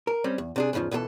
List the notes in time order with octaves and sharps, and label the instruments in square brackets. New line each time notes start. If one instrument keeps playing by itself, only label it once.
[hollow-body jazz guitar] A#4
G3 C4 C#4
E2
C3 D4 G#4
E2 G#2 C#3 E3 F3
C#2 B2 E3 G#4 A4